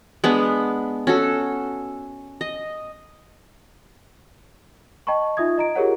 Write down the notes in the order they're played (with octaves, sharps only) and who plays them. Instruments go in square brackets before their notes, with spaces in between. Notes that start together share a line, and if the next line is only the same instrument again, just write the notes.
[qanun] G#3 B3 D4
C#4 F#4 A4
D#5
[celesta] D#5 G5 A5 B5 C#6
D#4 F4 E5 D#6 G#6
D#5 A#5 D7
F4 G4 G#4 A#4 C#5 F#5